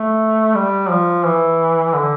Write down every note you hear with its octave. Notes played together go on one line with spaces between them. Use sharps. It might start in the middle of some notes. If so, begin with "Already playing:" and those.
Already playing: A3
G3
F3
E3
D3